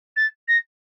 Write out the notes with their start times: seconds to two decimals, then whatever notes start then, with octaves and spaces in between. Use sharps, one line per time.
0.16 A6
0.48 A#6